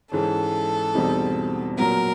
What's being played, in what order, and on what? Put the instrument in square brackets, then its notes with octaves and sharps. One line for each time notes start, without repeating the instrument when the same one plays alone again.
[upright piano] G#2 E3 G#3 C#4 [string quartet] A4
[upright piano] E2 B2 G3 C4 D#4
[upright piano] A#2 F#3 B3 [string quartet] A#4